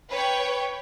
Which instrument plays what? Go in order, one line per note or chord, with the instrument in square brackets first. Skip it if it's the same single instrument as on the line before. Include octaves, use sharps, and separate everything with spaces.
[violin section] B4 C#5 G5